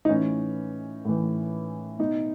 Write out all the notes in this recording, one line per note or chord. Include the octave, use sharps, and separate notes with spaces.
D#4
A2 E3 C#4
A2 E3
B2 D#4